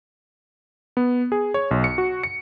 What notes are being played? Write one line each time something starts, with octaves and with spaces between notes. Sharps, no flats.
B3
G#4
C#5
B1
C#7
F#4
C#7